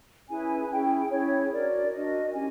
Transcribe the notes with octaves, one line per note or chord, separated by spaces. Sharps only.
C#4 E4 G#4 B4 G#5
C#4 E4 G#4 G5
C#4 E4 G#4 C#5
D4 F#4 A#4 D5
D4 F#4 A#4 D#5
C#4 E4 G4 G#5